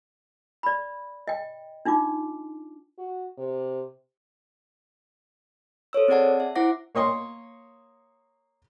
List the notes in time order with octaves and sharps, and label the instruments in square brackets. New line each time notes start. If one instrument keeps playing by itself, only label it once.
[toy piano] D5 B5
D#5 G5
D4 D#4 F4 D6
[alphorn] F#4
C3
[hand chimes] A4 C5 C#5 E6
C4 G#4 D5 F#5 A5
E5
E4 C5 F#5 D6 A#6
[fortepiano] A#3 C#5 D#5 C6